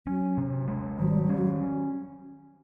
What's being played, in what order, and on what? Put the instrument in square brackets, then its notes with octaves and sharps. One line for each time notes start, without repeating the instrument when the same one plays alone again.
[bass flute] F#3 [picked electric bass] C#4
[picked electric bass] C3
G#3
[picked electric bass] D#3 [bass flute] F#3
[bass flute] G3
F#3
[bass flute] G3 [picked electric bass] C#4
[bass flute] F#3